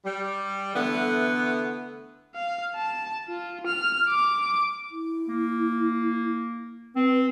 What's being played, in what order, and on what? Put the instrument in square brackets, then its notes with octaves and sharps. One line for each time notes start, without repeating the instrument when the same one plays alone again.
[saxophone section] G3
D3 E3 A3 B3
[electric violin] F5
A5
F4
F6
D6
[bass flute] E4
[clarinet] A#3
[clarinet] C4 [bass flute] B4